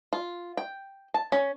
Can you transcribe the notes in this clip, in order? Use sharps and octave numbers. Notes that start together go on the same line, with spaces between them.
F4
G5
A5
C#4